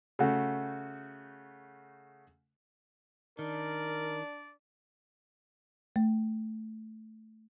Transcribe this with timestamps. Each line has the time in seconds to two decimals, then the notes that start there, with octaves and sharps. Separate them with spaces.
0.19 C#3 A3 F#4
3.39 D#3 D4 A#4 D5
5.96 A3